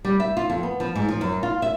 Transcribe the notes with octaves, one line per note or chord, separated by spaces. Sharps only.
G3
E5
F4
F2
B3
F3
G#2
F3
F#2
F4
E5